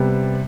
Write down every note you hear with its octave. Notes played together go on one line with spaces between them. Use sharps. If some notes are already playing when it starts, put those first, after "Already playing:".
Already playing: C3 G3 B3